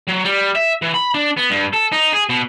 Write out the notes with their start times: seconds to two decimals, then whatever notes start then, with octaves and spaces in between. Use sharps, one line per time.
0.08 F#3
0.25 G3
0.56 E5
0.82 E3
0.95 B5
1.14 D4
1.37 B3
1.50 G2
1.73 A4
1.92 D#4
2.13 G#4
2.29 B2